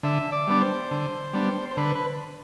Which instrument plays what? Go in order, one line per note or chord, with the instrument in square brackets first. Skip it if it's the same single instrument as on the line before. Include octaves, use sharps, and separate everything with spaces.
[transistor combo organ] D3 E5
D5
G3 B3 D4
C5
D3
G3 B3 D4
C5
D3 B4
B4